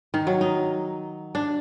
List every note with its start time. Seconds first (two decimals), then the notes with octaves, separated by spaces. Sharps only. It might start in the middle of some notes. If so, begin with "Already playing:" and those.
0.14 D#3
0.27 F#3
0.41 D#4
1.35 D4